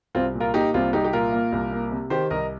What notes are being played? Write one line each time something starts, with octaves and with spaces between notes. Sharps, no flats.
C2 C4 F4
A#2
F4 A#4
A#3 D#4 G4
C2 C4 F4
C2 D#4 G4
G4
A#2 F4 A#4
A#3
C2
A#3
C3
D#3 G4 C5
C2 A#4 D#5